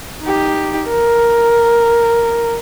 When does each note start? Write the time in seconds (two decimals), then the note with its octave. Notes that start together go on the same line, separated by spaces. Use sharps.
0.22 D#4 G4
0.90 A#4